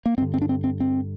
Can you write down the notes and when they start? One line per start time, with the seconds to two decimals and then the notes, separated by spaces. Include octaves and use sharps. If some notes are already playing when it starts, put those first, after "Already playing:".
0.06 A#3
0.18 G2 C4
0.22 D3
0.34 C4
0.42 D4
0.49 C4
0.64 C4
0.80 C4